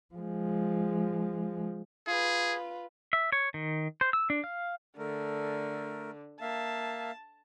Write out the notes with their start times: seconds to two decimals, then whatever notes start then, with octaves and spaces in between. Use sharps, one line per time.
0.15 F3 G#3
2.07 F4 G#4 B4
3.13 E5
3.32 C#5
3.54 D#3
4.01 C5
4.13 E6
4.30 D4
4.44 F5
4.98 D3 A3 A#4
6.41 A#3 E5 F5 A5